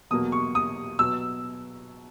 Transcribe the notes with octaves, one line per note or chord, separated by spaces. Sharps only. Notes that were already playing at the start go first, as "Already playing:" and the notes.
E2 B2 F#3 A#3 D#6
C#6
D#6
B2 F#3 B3 E6